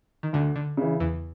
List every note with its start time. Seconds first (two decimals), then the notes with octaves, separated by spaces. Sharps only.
0.23 D#3
0.33 D2 D3
0.56 D3
0.77 C#3 E3
1.00 E2 E3